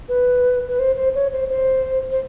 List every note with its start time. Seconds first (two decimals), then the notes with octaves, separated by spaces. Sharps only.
0.09 B4
0.69 B4
0.79 C5
0.96 C5
1.15 C#5
1.32 C5
1.50 C5
2.11 C5